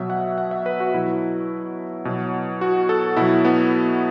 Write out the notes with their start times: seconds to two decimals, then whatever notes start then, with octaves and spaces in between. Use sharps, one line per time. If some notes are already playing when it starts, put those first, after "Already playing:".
Already playing: B2 F#3 E5
0.10 F#5
0.38 F#5
0.51 E5
0.66 B4
0.80 F#4
0.94 B2 F#3 E4
2.05 B2 F#3
2.61 F#4
2.89 A4
3.17 B2 F#3 E4
3.45 B3